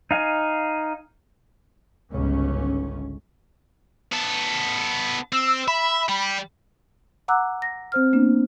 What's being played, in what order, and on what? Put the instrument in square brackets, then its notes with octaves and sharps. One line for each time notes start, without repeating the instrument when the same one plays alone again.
[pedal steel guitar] D#4 F5 G#5
[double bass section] G1 C#2 G#2 C#4
[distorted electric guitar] B3 A4
[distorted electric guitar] C4 [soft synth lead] E6
[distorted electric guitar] E5 [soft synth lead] B5
[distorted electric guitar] G3
[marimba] F#5 A#5 D6 E6 F#6
A#6
C4 C5 F6
A#3 B3 D4